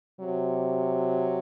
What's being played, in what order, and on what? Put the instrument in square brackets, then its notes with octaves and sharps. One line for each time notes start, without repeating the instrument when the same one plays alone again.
[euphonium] C3 [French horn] F#3